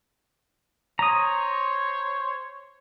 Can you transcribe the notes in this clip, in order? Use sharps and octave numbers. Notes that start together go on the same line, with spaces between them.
C5 C#5 A#5 D#6